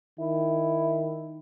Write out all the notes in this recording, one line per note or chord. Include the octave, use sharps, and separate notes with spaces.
D#3 E4